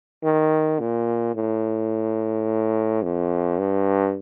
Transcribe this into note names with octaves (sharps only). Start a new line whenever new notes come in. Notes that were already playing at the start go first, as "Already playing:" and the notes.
D#3
A#2
A2
F2
G2